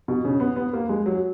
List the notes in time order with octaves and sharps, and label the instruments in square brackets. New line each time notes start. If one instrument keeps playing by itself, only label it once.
[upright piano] B2
C#3
B3
B3
A#3
G#3
F#3